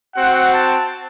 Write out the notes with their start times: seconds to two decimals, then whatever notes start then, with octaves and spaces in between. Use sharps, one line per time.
0.15 C4 F#4 F#5
0.54 A5